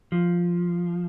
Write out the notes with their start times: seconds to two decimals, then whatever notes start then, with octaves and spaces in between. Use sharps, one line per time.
0.12 F3